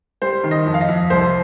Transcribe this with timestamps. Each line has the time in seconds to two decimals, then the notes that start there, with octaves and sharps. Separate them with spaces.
0.22 G3 C5
0.44 D#3
0.51 D#5
0.66 F2
0.74 F5
0.81 D#5
0.89 F2
1.10 C2 C5